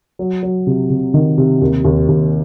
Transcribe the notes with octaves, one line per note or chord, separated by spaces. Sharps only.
F#3
F#3
C3
C3
D#3
C3
D#2
D#2
D#2